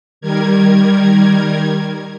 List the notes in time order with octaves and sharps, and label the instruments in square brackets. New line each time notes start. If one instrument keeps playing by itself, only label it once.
[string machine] D#3 G3 A#4 G#6